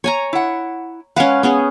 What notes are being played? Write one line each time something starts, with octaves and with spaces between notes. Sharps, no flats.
C#5 G#5 A#5
E4 F#5
G#3 C#4 B4 F5 F#5
B3 C#4 G#4